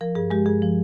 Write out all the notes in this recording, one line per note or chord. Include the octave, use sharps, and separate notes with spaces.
F3 A#4
G2 G#4
G#3 G4
G2 G#4
F3